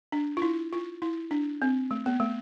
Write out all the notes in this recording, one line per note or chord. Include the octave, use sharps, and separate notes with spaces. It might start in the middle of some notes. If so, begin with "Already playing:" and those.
D4
F4
E4
F4
E4
D4
C4
A3
B3
A3